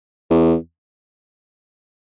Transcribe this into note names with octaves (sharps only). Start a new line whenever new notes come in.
E2